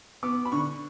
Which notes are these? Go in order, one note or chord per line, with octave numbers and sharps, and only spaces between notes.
B3 D6
B5
D3 C#6